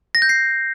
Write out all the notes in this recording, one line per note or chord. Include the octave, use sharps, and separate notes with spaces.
A#6
G6
C7